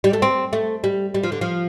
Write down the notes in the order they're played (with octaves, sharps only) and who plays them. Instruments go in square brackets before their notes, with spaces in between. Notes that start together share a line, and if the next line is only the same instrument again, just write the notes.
[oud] G3
A3
C4
A3
G3
G3
F3
D3
F3